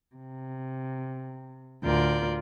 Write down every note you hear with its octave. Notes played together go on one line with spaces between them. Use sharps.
C3
D2 A2 F4 A#4 D5 G6